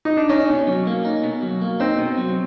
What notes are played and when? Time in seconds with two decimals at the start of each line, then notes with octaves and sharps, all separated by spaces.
0.05 D#4
0.17 D4
0.29 C#4 D#4
0.49 B2
0.67 F#3
0.87 A#3
1.05 D#4
1.24 B2
1.42 F#3
1.62 A#3
1.80 C4 D#4
1.99 B2
2.18 F#3